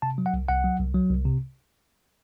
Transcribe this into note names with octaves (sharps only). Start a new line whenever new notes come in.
C3 A5
F#3
F#5
C2
C2 F#5
F#3
C2
F#3
C2
C3